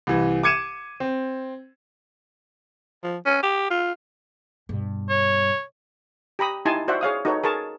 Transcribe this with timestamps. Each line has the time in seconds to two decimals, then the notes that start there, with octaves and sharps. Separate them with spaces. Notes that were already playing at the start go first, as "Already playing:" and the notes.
0.07 C2 E3
0.43 D6 G#6 C#7 D#7 E7
1.00 C4
3.03 F3
3.26 C#4
3.43 G4
3.70 F4
4.69 G2 B2
5.10 C#5
6.39 G4 A#5 B5 D#6
6.65 D#4 E4 G4 G#5 A5 C6
6.88 F#4 C5 D5 E5 F#5
7.01 G#4 C#5 F5 D#6
7.25 D#4 F#4 A4 B4 C#5
7.44 G#4 A#4 A5 C#6